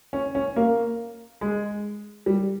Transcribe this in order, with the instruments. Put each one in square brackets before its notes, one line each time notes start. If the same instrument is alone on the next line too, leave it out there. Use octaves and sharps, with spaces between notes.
[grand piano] C#4
C#4
A#3
G#3
G3